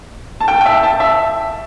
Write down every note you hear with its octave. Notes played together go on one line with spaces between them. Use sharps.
A5
G5
G5
E5
A5
E5